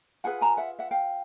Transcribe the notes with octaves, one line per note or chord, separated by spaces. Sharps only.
F4 G#4 B4 F#5 G#5
G#5 A#5
E5 F#5
E5 F#5
F5 G5